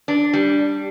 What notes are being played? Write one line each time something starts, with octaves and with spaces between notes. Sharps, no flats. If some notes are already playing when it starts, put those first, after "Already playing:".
D4
G3